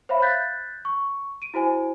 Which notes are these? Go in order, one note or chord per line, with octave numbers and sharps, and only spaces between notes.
C5 C#5 E5 F5 B5
F#6 G6 A6 B6
C#6
D7 D#7
E4 F#4 C5 G#5